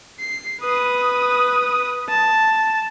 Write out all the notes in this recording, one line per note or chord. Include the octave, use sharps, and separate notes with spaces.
C7
B4 D#6
A5